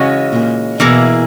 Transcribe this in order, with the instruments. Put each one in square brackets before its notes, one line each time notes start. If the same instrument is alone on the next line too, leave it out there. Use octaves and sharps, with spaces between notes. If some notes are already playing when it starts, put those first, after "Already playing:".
Already playing: [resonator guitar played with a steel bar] C#3 E3 G#3 C#4 F#4
[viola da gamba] A#2
[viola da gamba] B2 [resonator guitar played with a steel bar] E3 A#3 E4 G#4